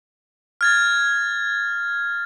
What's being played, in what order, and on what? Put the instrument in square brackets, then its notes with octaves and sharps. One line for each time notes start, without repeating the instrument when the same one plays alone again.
[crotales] F6 G#6 A6